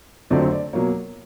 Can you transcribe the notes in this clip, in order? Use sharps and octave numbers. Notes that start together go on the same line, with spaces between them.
F2 D3 F#3 A3 C4 D5
D5
B2 F#3 A#3 C#5